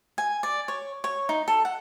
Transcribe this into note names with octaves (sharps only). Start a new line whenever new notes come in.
G#5
D5
C#5
C#5
D#4
A4
F#5